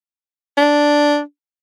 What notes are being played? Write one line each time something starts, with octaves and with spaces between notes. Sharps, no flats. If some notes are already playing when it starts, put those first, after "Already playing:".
D4